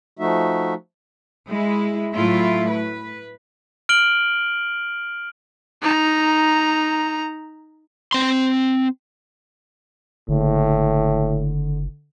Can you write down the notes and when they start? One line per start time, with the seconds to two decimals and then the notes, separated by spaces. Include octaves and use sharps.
0.19 F3 A3 D#4 F#4 E5
1.49 G#3 E4
2.14 A2 F#3 A3 E4 F4
2.70 B4
3.89 F6 D7 F#7 G7
5.81 D#4 A#5
8.13 C4 C6
10.29 F#1 A2 D3